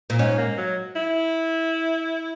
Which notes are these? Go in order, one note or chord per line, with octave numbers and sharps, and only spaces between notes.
A#2
G#2 C#4
A#3
F#3
E4